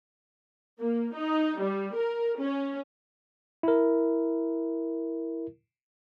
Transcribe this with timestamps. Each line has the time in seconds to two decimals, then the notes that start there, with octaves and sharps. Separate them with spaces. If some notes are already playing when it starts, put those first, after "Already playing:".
0.78 A#3
1.14 D#4
1.59 G3
1.94 A#4
2.38 C#4
3.63 E4 A#4